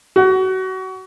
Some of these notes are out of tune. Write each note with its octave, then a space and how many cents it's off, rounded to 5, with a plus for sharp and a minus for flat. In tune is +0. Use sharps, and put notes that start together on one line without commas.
F#4 +30